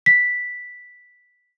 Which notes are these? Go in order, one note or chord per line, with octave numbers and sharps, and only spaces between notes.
B6